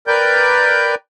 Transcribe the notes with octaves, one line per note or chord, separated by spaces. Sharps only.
A#4 B4 D5 G5 G6